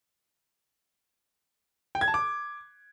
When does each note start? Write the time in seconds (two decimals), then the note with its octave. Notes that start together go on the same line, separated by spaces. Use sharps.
1.95 G5
2.01 G#6
2.08 A5
2.14 D6